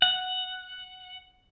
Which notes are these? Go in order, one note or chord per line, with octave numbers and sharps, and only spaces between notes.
F#5